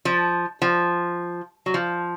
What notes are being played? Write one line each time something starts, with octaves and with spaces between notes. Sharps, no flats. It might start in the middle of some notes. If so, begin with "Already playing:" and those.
F3
F3
F#3
F3